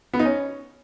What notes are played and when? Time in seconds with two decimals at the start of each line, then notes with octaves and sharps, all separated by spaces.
0.14 B3
0.19 D#4
0.25 C#4